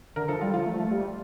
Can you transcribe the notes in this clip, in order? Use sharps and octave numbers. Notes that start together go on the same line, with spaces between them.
D3 A#4
F3 A4
G3 F4
F3 F4
A3
G3